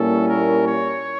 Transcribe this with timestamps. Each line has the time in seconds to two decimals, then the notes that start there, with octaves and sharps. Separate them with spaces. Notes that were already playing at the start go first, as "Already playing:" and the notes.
Already playing: A#2 G3 A#3 C#4 E4 A4
0.29 A#4
0.66 C#5